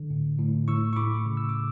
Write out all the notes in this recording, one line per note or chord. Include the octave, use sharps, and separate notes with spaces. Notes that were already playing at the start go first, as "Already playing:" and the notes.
Already playing: D3
A2
A2
A2 C#6 E6
C#6
A2 B5 D6
C#3
E6
D6